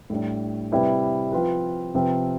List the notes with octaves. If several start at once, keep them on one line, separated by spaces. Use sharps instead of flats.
A2 G3 D4
C3 G3 C4 E4 B4
F3 C4 F4 B4
C3 F3 C4 F4 B4